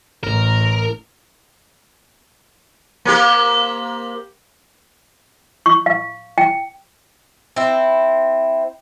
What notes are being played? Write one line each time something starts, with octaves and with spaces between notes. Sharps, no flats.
A1 A#4
A#3 C4 G4
C#6
F5
G5
C4 E4